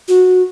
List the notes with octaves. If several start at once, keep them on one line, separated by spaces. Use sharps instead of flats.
F#4